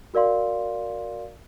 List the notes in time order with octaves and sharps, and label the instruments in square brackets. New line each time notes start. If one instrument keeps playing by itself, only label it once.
[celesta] F#4 A#4 D5 F5 C6